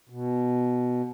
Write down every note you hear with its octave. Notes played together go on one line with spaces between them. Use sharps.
B2